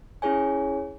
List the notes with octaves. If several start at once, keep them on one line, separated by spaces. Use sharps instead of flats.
C#4 E4 G#4 C#5 G#5